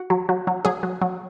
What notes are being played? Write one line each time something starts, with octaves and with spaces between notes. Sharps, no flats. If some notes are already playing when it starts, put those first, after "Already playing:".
Already playing: F#4 F#5
F#3
F#3
F#3
F#3 G#4
F#3
F#3